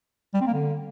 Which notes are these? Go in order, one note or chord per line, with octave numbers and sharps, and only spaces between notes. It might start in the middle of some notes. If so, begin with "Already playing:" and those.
G3
C4
A#3
D3